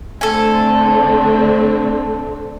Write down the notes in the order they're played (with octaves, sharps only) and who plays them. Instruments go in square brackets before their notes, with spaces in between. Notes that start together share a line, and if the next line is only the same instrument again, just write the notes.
[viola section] D3 A3 C4 [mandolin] A4 G#5